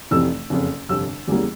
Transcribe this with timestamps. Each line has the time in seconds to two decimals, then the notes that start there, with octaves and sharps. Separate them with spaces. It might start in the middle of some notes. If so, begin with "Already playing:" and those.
0.11 F1 F2 C3 E3 A3 E6
0.50 F#1 F2 C#3
0.89 G1 F2 C3 E6
1.27 E2 C#3 E3 G3 A#3